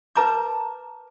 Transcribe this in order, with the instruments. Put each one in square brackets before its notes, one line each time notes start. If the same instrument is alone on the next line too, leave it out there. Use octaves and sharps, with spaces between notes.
[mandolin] A#4 A5 G6 [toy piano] B4 A#5 D6